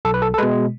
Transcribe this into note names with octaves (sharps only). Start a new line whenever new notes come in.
B1 A4
B4
A4
A4
B2 G#3 B4